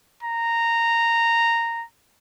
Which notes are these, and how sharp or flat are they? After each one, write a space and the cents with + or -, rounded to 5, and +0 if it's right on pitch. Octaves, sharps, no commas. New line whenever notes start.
A#5 -10